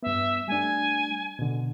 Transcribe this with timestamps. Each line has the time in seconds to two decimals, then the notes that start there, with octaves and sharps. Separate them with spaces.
0.03 G2 B3 E5
0.48 G3 A3 D4 G#5
1.39 B2 D3